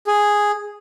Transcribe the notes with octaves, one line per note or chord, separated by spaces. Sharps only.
G#4